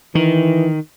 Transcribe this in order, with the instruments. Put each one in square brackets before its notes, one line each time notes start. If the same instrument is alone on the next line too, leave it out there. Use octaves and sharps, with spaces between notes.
[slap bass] D#3 [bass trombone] E3